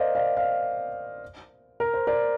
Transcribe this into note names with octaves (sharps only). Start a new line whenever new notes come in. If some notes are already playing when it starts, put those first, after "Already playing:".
Already playing: A#4 C5 D5 D#5 F5
D5 F5
D5 F5
A#4
C5
A#4 D5